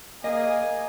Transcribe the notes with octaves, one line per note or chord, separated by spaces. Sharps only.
A#3 D#5 G#5 D#6